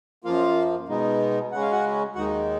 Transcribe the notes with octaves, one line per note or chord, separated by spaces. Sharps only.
F#2 F3 A#3 F4 F5
B2 G#3 B3 D#4
C#3 G#3 C#4 F#5
F5
F#4 F#5
D#2 D#3 G#3 D#4 F#4 F#5